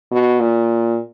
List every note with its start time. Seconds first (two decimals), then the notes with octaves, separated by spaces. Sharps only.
0.12 B2
0.40 A#2